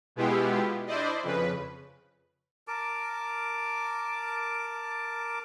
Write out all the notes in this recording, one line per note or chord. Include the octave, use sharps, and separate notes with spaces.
B2 G#3 B3 E4 F4 G4
D4 E4 C5 D5 D#5
F2 C#3 B4
A#4 A5 D6